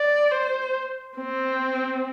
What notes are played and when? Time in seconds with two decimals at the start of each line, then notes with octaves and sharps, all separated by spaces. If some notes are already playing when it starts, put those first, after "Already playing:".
Already playing: D5
0.32 C5
1.18 C4